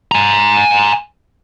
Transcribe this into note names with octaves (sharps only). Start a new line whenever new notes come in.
G#5 A#5